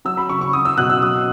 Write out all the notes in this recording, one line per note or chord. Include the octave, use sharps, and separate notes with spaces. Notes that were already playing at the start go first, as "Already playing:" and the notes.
F#3 E6
B5
C#3 C#6
C#6
F#3 D#6
E6
B2 F#6
E6
F#3 D#6